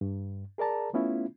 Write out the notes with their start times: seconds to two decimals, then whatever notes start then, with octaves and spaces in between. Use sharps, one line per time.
0.01 G2
0.58 G#4 A#4 D5 A5 A#5
0.93 A3 B3 C#4 E4 F4